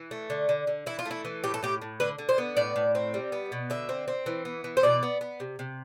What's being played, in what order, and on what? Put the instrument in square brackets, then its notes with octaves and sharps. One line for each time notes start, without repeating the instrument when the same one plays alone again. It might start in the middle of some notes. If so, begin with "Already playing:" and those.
Already playing: [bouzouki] E3
A3
D3
D3
D3
E3 E4
F4
A3
E4
E3
A2 G4
A4
A2 G4
A2
D3 B4
D3
C5
B3
A2 D5
A2
C4
G3
B3
B2
D3 E5
C4
C4
E3
B3
E3
C5
B2 D5
B3
B3
C3
C3